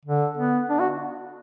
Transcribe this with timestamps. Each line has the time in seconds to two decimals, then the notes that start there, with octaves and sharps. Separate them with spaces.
0.05 D3
0.37 B3
0.69 D4
0.79 F#4